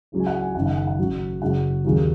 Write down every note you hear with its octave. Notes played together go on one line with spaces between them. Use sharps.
C#2 C#3 F#3
G#5
F#5
G#5
F#1 F#2 D#3 F#5
F#5
F#5
F#5
F#1 F#2 F#3
F#1 F#2 C#3 F#3 F#5
D#2 C#3 F#3